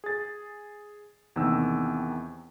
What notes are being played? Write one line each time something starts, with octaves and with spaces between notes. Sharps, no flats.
G#4 A6
E2 C3 D#3 A#3 E6